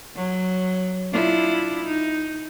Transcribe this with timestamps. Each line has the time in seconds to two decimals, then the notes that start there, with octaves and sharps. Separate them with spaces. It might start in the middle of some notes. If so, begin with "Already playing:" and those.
0.16 F#3
1.13 D4 E4 F4
1.85 D#4